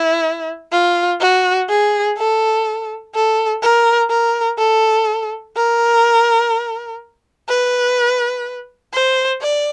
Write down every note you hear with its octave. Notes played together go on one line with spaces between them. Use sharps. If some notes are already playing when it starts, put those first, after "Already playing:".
Already playing: E4
F4
F#4
G#4
A4
A4
A#4
A#4
A4
A#4
B4
C5
D5